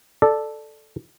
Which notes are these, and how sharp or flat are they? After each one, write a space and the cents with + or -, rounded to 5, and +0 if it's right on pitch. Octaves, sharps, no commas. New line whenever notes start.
A4 +0 D5 +15